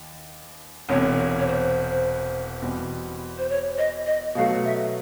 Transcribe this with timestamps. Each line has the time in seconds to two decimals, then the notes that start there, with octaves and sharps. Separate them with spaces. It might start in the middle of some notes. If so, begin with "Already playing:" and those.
Already playing: D#2
0.89 E1 E2 C3 C#5
1.18 C#5
1.39 C#5
1.47 C5
2.62 E2 B2 G3 C4
3.38 C5
3.50 C#5
3.78 D#5
4.06 D#5
4.35 B2 F#3 A3 F5
4.65 E5